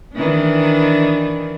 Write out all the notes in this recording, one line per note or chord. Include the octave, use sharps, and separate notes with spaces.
D#3 E3 D4